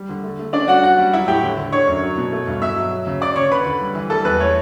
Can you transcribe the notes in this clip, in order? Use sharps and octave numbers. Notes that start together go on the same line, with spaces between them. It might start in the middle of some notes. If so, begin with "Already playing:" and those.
Already playing: G3
D3
A3
A3
C#4 D4 D5
G3 F#4 F#5
C#4 F#4 F#5
G3
F#3 E4 E5
A2 G4 G5
D3
D3
D4 C#5 C#6
F#2
F#3
B2
A3
G2
B2 E5 E6
F#3
F#3
C#3
C#4 D5 D6
C#3 C#5 C#6
D3 B4 B5
D3
G3
E3
G3 A4 A5
E2 B4
A3 C#5